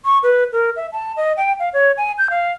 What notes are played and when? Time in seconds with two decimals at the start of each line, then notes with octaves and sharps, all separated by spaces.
0.05 C#6
0.23 B4
0.53 A#4
0.76 E5
0.92 A5
1.17 D#5
1.37 G5
1.60 F5
1.73 C#5
1.97 G#5
2.18 G6
2.30 F5